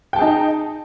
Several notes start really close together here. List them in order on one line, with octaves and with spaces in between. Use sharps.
G5 A5 G#4 D#4